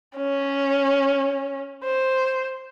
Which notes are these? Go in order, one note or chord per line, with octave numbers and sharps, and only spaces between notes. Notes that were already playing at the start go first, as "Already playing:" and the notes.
C#4
C5